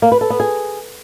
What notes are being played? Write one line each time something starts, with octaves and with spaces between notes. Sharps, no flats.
A#3
B4
A4
B3
G#4